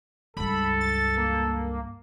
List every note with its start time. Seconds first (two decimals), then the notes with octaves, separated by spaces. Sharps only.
0.37 C#2 G2 A4 B5
0.81 A6
1.17 A#3